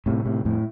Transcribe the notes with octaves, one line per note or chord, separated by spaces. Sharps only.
A2 C3
A2 C3
F2 A2